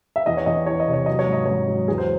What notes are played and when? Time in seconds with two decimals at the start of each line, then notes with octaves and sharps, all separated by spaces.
0.16 E5
0.26 E2 D#5
0.37 C#5
0.46 E2 D#5
0.66 E3 C#5
0.80 D#5
0.88 C3
0.93 C#5
1.06 F#3 D#5
1.19 C#5
1.27 G#2
1.33 D#5
1.46 G#2 C#5
1.68 F#3
1.88 E2 G#4
1.98 C5